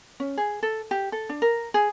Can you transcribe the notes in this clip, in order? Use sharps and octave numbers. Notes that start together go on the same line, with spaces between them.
C#4
G#4
A4
G4
A4
D4
A#4
G#4